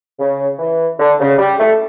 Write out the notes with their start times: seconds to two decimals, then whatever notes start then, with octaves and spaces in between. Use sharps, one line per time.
0.19 C#3
0.59 E3
0.99 D3
1.20 C#3
1.39 G3
1.59 A3